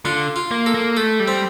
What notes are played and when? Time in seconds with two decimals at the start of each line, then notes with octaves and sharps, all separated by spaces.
0.05 D3 F4
0.36 F4
0.51 A#3
0.66 A4
0.74 A#3
0.97 A3 A4
1.20 G3
1.28 C4